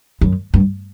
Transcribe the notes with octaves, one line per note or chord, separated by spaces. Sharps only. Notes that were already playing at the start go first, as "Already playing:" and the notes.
F#2
G2